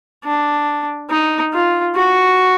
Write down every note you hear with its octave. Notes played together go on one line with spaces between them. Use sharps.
D4
D#4
F4
F#4